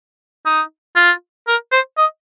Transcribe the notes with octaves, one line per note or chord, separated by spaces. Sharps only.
D#4
F4
A#4
C5
D#5